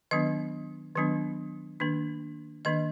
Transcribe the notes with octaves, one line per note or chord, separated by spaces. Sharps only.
D#3 F#3 B3 D4 D#5
D#3 F#3 B3 D4
D#3 A#3 D4
D#3 A#3 D4 D#5